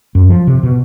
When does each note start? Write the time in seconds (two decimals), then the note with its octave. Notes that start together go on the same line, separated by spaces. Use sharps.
0.15 F#2
0.29 F3
0.47 C3
0.63 B2